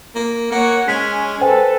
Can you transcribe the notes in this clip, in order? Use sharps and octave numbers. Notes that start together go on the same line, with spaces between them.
A#3
A#3 C#5 F#5
G#3 C#4 G#5 B6
A4 B4 C5 G5 G#5